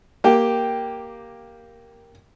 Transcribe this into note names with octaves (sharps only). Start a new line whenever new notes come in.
A#3 G4 G5